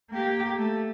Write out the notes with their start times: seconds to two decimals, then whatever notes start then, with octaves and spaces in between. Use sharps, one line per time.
0.11 A#3 G4
0.58 A3